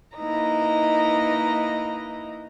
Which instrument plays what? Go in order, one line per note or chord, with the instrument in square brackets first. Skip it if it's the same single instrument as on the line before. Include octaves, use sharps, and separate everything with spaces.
[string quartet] A#3 D#4 E4 B4 D#5 A#5